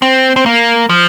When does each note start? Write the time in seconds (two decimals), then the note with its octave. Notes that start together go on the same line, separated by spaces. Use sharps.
0.02 C4
0.36 C4
0.46 A#3
0.89 F3